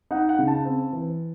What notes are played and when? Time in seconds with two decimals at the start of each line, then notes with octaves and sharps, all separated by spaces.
0.11 D#4 F#5
0.29 F#5
0.39 C#3
0.47 A5
0.65 C4
0.93 E3